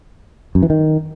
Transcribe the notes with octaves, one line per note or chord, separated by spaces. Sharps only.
F#2
E3
D#3